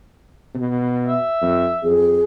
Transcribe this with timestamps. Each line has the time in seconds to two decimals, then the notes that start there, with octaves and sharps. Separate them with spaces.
0.55 B2
1.08 E5
1.42 F2
1.83 F2 G#4